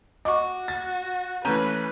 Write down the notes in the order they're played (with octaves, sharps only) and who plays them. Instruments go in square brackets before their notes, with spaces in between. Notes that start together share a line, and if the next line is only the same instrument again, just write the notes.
[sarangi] F#4 [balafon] D#5 C#6 [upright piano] D6
[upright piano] A6
[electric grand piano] E3 A3 C#4 [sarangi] B4 [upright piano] A#5 G6 D#7